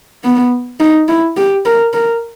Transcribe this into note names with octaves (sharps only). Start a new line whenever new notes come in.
B3
D#4
E4
G4
A#4
A#4